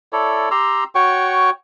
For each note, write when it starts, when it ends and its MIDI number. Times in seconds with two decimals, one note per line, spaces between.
0.13 0.49 64
0.13 0.49 69
0.13 0.49 73
0.13 0.49 74
0.51 0.84 67
0.51 0.84 82
0.51 0.84 84
0.51 0.84 88
0.95 1.50 66
0.95 1.50 73
0.95 1.50 79
0.95 1.50 85